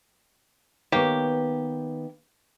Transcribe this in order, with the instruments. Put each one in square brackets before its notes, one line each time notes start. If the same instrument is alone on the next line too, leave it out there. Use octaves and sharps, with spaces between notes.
[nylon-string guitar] D#3 B3 C#5 [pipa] A#3 G4